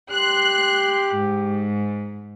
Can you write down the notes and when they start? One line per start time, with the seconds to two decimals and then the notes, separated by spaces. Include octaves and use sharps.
0.11 G4 C6 F#6
1.16 G#2